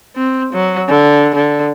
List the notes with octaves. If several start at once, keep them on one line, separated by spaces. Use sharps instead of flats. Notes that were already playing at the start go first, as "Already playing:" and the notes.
C4
F#3
D3
D3